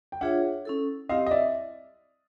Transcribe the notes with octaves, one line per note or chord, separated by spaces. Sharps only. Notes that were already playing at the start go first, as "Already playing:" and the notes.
G5
D4 F4 G#4 C#5 E5 F#5
C#4 E4 A4
C4 E4 G4 D#5 F5
D#5
D5 E5